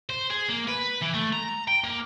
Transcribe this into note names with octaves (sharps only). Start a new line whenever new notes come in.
C5
G#4
A#3
B4
E3
A3
A#5
G5
A#3